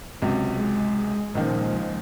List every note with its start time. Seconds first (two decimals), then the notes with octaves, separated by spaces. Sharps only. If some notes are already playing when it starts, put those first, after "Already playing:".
0.22 C#2 C3 F#3
0.56 G#3
1.35 C#2 A#2 D#3 F3 G#3